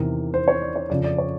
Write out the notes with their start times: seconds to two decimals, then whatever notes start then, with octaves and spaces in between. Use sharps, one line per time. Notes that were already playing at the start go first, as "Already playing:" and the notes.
Already playing: E2 C3 D#3 A#4
0.34 C5
0.48 C#5
0.62 D5
0.76 C#5
0.90 F2 C#3 F3 D5
1.04 D5
1.18 C#5